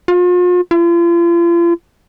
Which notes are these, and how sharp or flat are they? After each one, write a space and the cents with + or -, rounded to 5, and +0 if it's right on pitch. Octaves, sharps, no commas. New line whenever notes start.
F4 +40
F4 -40